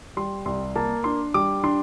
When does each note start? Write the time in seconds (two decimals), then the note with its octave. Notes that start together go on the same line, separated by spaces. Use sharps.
0.17 G3 C6
0.46 C2 C6
0.76 A#3 A5
1.04 D4 C6
1.34 G3 D6
1.64 D4 C6